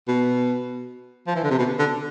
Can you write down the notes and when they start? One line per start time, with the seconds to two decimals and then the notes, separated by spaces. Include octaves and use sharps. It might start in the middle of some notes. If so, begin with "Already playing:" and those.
0.08 B2
1.27 F3
1.36 E3
1.44 D3
1.51 C3
1.59 B2
1.79 D3